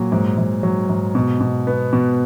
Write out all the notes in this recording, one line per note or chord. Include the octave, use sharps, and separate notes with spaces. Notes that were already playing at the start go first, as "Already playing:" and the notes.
Already playing: A#2 F#3
G#2
G#2
F#3
G#2
B2
B2
B3
B2